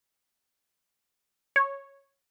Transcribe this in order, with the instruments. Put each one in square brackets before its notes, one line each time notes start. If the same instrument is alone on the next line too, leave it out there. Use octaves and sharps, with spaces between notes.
[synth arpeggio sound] C#5